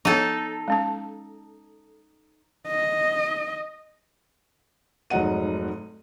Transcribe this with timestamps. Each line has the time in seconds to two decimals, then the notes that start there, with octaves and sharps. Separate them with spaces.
0.05 F3 B3 D#4 A4 C#5
0.68 G#3 C#4 A5
2.68 D#5
5.10 F1 G#2 F#3 D#5 F#5 D#7